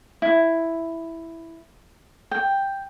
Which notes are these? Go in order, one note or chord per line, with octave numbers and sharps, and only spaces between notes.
E4
G5